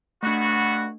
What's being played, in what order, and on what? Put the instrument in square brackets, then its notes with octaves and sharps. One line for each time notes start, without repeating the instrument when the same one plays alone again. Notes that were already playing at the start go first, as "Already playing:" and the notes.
[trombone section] G2 B3 F#4 [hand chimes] A3 D4